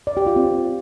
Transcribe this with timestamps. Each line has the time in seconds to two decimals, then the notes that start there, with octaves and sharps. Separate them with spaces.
0.07 D5
0.17 G4
0.27 F4
0.36 C4